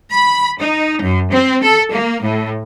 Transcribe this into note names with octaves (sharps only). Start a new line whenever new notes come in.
B5
D#4
F#2
C4
A4
A#3
A2